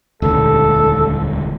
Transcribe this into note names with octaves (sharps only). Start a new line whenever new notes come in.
D#1 C#2 D3 A4